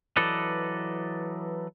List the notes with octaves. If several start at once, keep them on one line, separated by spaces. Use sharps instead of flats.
E3 F#3 A4 B4 D5 D#5